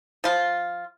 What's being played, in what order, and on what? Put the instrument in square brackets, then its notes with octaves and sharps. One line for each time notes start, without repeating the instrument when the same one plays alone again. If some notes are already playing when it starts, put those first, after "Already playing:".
[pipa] F3 F4